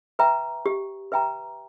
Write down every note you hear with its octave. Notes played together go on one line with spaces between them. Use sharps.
B4 E5 G5 A#5
G4
B4 E5 G5 A#5